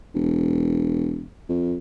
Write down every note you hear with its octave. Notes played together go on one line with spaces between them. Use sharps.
E1
F2